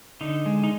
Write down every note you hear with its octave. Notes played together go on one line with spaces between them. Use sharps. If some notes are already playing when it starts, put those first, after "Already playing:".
D3 D#4
G#3
D#4